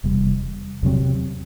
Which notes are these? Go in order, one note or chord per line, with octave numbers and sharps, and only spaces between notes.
E1 E2 C3 G3
E2 C3 F#3 C4